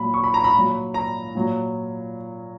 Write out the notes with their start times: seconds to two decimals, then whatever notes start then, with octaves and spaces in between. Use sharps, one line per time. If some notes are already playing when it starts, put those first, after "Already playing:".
Already playing: A#2 F#3 B5
0.14 C#6
0.24 B5
0.34 A#5
0.44 B5
0.54 A#2 F#3
0.94 A#5
1.35 A#2 F#3